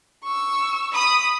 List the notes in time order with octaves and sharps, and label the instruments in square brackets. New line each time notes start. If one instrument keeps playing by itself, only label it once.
[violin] C#6 E6
[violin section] B5 D#6